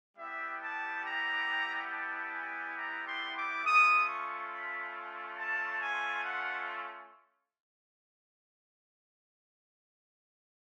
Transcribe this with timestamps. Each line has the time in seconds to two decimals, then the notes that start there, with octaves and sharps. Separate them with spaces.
0.17 G3 B3 E4 G4 E5
0.62 A5
1.05 A#5
1.91 A5
2.34 G#5
2.77 A#5
3.07 C6
3.36 D6
3.64 A3 C#4 F4 D#6
4.08 C#6
4.51 B5
5.38 A5
5.81 G#5
6.24 F#5